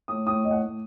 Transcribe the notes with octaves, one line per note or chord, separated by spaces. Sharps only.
A2 D#6
A2 D#6
A2 D#5
F#5
A2